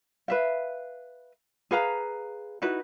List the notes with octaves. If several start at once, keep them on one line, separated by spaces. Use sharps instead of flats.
B4 E5 F5
G#4 B4 F5 A#5
D#4 E4 F#4 B4